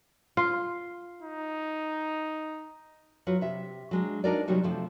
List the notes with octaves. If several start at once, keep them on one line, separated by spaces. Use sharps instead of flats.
F4
D#4
F#3 F4 F#4 B4
C3 E5
F#3 G#3 D4
D4 D#4 F#4 A#4 B4 D5
C3 F#3 G3 C#4 D#4 F#4
C3 F3 A3